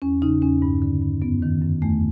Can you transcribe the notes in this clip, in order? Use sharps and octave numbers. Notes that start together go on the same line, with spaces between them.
E2 C#4
C#3 D#4
E2 C#4
G2
D3
G2
F#2 B3
D#3
F#2
E2 A3